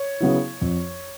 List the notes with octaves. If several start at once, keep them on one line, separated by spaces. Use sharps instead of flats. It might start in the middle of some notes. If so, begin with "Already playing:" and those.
Already playing: C#5
C#3 F#3 B3 E4
F2